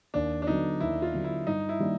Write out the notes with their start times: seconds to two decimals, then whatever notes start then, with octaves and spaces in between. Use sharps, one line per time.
0.14 D#2 D4
0.42 D4
0.47 D3 F#3 B3 D#4
0.80 D#2 E4
1.02 F4
1.14 D3 F#3 B3
1.24 E4
1.47 G2 D#4
1.69 E4
1.79 D#3 G3 A#3 D4